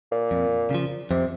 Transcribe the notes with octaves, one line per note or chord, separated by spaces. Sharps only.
A#2
F2
C#3 F3
F2 C3